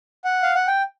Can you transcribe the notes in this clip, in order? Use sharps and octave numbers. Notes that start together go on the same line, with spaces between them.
F#5
F5
F#5
G5